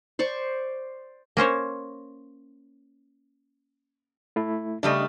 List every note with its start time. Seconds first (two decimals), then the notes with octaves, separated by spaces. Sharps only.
0.19 C5 D5 C#6
1.37 A#3 C#4 C5 C#5
4.36 A3 E4
4.83 C#3 G3 A3 D4 D#5